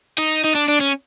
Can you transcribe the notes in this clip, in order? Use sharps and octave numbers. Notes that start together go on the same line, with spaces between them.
D#4
D#4
D4
D4
C#4